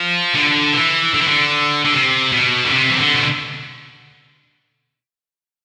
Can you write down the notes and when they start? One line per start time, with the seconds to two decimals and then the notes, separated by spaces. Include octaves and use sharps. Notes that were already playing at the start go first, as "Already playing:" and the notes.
Already playing: F3
0.34 D3
0.73 E3
1.14 D3
1.22 E3
1.28 D3
1.85 D3
1.92 C3
2.32 B2
2.65 D3
2.72 C3
2.90 E3
2.98 D3
3.15 B2